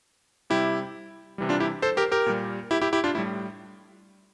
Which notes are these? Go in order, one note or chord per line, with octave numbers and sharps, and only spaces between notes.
C3 G3 E4 G4
C3 E3 G3
D4 F4
E4 G4
A4 C5
G4 A#4
G4 A#4
A#2 G3
E4 G4
E4 G4
E4 G4
D4 F4
A2 G3 E4